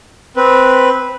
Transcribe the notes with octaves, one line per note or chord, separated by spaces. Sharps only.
C4 B4